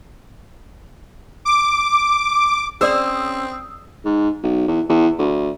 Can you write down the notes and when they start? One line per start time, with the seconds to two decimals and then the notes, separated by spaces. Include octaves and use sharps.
1.45 D6
2.81 C4 C#4 G#4 C5 D5 C6 D#6 E6
4.05 G#2
4.43 B1
4.68 E2
4.90 E2
5.19 D2